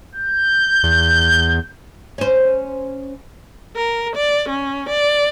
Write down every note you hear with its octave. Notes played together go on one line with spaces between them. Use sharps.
G6
E2
C#4 C5
A#4
D5
C#4
D5